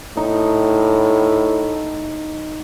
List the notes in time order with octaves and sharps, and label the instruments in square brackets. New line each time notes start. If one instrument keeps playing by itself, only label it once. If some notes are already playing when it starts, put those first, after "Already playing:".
[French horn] A2 [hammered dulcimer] D#4